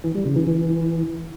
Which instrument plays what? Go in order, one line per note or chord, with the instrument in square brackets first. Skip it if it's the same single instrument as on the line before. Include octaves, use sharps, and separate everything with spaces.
[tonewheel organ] E3
G3
C#3
E3
E3